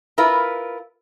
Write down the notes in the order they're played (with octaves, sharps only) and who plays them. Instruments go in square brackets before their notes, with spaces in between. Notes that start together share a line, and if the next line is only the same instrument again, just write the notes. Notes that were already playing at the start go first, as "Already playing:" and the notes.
[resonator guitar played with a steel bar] E4 F4 A#4 B4